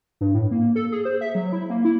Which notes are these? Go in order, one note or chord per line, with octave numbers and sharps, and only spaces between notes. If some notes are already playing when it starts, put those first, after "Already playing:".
G2
A2
A#3
A4
G#4
C5
E5
F#3
E4
A#3
E4